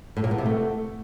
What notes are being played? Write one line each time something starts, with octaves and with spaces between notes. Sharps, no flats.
A2
A#2
B3
C3
A3